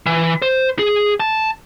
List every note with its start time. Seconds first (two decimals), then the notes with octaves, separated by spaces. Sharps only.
0.06 E3
0.42 C5
0.79 G#4
1.20 A5